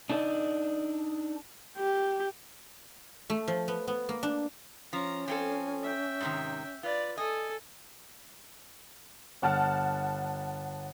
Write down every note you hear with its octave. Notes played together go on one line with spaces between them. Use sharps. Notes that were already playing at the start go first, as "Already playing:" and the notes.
D4 D#4 A4 C5 D5 D#5
G4
A3
F3
B3
B3
A#3
D4
F3 C#4 A#5
F3 C4 A4 G#5
E5 G5
G#2 C3 D#3
F4 B4 D5
A4 D#5 G#5
G1 F#5 A5 F6